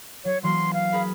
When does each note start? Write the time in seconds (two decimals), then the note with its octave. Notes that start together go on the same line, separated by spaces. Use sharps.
0.25 F#3 C#5
0.44 E3 F#3 A#3 C6
0.74 F5
0.93 G#4 A#4 B5